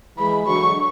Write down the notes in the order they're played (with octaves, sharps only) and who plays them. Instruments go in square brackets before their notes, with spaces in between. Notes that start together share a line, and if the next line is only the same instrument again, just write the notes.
[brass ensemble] E3 G#3 [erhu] B5
[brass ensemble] D3 F#3 [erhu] C#6